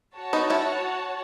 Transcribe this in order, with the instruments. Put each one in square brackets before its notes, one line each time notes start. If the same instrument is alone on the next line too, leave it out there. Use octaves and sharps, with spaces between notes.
[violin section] F#4 C#5 F#5 A5
[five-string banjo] B3 D#4
C#4 E4